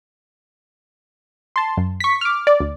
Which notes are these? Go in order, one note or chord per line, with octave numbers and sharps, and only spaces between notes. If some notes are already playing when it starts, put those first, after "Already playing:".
A5 C6
F#2
C#6 B6
D6 F6
D5
D2